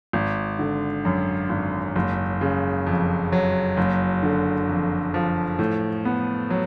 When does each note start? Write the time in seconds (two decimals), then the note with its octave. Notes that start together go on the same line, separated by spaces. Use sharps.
0.13 G#1
0.59 D3
1.05 F#2
1.50 G#1
1.96 F#1
2.41 C#3
2.87 F2
3.32 F#3
3.77 F#1
4.23 D3
4.68 F2
5.14 F3
5.59 A2
6.05 B3
6.50 F#3